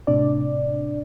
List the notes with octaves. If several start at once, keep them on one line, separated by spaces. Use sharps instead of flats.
A2 C3 D4 D5